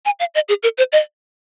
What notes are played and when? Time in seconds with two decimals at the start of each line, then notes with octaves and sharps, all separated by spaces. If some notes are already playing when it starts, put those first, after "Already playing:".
0.05 G#5
0.20 F5
0.35 D#5
0.49 G#4
0.63 A#4
0.78 C5
0.92 D#5